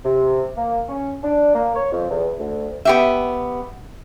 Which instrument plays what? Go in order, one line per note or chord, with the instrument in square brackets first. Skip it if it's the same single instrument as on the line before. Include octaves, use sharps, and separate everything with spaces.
[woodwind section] C3
A#3
C#4
D4
A#3
C#5
F2
E2
D2
[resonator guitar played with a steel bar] B3 G4 E5